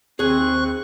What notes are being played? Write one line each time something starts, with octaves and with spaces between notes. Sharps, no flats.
D#2 C4 G#4 G#5 C#6 F#6